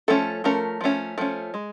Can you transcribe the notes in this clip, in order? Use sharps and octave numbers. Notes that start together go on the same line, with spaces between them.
F3 A3 C#4 A4
F3 A3 C#4 A#4
F3 A3 C#4
F3 A3 C#4
G#3